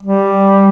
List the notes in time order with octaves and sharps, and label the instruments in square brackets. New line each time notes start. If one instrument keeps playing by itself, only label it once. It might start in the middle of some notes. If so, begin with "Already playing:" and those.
[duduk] G3